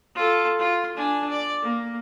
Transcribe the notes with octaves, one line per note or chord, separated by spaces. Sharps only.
F4 A4
F4
D4 G#5
D5
A#3